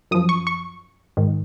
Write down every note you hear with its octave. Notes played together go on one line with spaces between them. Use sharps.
F#2 F3 D#6
C#6
C#6
G#2 D#3